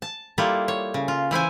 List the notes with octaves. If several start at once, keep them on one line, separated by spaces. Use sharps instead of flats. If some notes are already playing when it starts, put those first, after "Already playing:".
A5
G3 A#3 E4 F4 A4
C#5
C#3
F4
E3 E4 C5 G#5